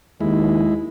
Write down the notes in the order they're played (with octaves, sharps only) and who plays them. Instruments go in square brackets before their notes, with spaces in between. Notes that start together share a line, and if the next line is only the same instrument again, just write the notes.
[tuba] D#2 [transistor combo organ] G#3 E4